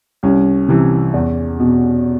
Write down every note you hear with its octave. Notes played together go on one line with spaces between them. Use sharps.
C2 C#4
C3 E3
E2
B2